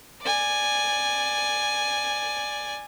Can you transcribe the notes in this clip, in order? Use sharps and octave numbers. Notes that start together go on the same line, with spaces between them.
D5 G#5